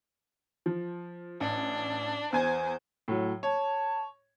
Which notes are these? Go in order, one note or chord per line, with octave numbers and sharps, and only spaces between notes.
F3
A1 D4
E2 C5 G#5 G#6
A2 F#3
C#5 A5